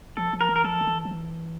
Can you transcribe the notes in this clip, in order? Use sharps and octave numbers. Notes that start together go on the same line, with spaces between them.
F3 A4
F3
A#4
E3
A#4
F3 A4
D#3
E3
F3
E3